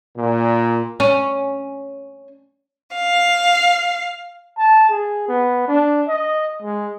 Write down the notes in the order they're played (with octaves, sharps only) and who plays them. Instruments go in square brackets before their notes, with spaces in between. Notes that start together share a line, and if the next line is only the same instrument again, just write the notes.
[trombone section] A#2
[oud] C#4
[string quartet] F5
[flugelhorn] A5
G#4
B3
D4
D#5
G#3